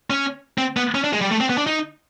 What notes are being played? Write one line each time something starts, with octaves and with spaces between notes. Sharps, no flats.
C#4
C4
B3
C#4
D4
G#3
G3
A3
C4
B3
D4
D#4